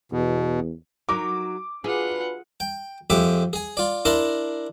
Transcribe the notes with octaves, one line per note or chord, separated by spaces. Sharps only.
E2 B2
F#3 D#4 A#4 D6
D4 F4 F#4 G#4 B4 F#5
G5
F2 G#3 G4 E5 D6
G#4 G#5
F4 D5
D4 E4 A#4 A5 C6